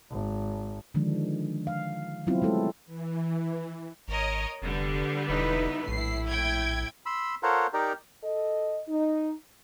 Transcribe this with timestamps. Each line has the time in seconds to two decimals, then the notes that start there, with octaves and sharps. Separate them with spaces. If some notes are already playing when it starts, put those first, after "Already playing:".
0.11 G#1
0.94 D3 D#3 F3 G#3 D4
1.67 F5
2.27 F#3 B3 C4 E4 F4
2.42 G#3 A3 E4 A4
2.86 E3
4.08 G#1 A#4 C#5 D#5
4.62 F1 D3 G3 B3
5.29 E1 D#4 E4 B4
5.88 A#1 A2 E4 C7
6.27 G5 G#6
7.06 B5 C6 E6
7.43 F4 A4 A#4 C5 C#5 F#5
7.73 D#4 G4 A#4 D5
8.24 A4 D#5
8.88 D#4